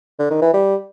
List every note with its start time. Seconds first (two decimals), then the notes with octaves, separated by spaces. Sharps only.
0.19 D3
0.30 D#3
0.42 E3
0.53 G3